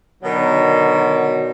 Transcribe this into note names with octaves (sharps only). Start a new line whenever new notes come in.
B2 D3 D#3 F#3 D#4